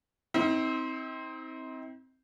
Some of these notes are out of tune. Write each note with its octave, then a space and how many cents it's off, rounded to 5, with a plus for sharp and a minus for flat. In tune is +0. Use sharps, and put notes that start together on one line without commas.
C4 +0 D#4 +45